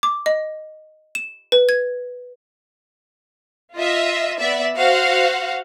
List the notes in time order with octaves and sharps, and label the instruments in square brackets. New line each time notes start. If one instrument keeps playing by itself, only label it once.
[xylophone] D6
D#5
E7
B4
G#6
[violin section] F4 D#5 E5
B3 D5 E5
F#4 C5 F5 F#5